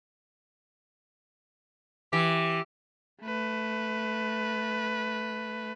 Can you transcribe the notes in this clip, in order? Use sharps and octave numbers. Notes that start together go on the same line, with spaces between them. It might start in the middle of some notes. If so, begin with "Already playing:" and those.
E3 G4
A3 B4